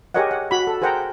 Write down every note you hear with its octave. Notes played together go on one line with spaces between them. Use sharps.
G4 G#4 A#4 C#5 D#5 F#5
F#5
F#4 B5
A4
G#4 A#4 C5 F#5 G5 A#5